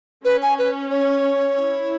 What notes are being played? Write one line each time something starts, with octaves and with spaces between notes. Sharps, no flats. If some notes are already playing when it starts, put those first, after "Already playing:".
C#4 B4
G#5
B4
C#5
E4